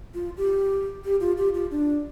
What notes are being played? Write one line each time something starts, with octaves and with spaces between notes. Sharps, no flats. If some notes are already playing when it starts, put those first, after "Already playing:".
F4
G4
G4
F4
G4
F4
D4